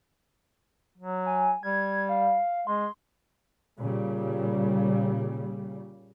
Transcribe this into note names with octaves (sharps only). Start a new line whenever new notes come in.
F#3
G#5
G3 G#6
F5
G#3 C6
A#2 C#3 G3